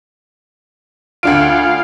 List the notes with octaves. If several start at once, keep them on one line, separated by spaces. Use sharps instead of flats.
D2 D4 F4 F5 D7